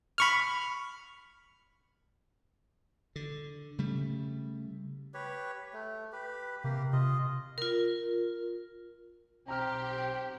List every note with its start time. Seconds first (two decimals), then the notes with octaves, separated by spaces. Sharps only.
0.18 B5 C#6 F6
3.16 D3
3.78 C#3 G3 A3
5.14 G4 B4 C#5
5.73 A3
6.12 G4 B4
6.64 C3 A#3 G4
6.93 C3 F4 D#5
7.58 F4 A#4
9.48 B1 C4 G4 G5 A#5 F6